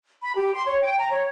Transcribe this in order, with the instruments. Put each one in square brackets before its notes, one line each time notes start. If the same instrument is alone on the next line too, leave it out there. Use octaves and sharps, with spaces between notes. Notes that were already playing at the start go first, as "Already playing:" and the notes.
[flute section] B5
G4
C6
C#5
G5
A#5
C#5